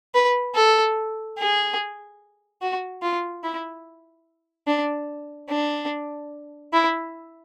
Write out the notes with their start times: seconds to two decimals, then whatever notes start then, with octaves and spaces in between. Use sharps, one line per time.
0.15 B4
0.55 A4
1.39 G#4
2.62 F#4
3.02 F4
3.44 E4
4.68 D4
5.50 D4
6.73 E4